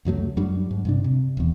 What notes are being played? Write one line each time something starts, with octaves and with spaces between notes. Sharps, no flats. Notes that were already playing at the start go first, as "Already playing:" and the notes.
C#2 F#2 F#3 A3
F#2 F#3 G3 D4
G#2
G2 C3 D4
C3
D#1 E2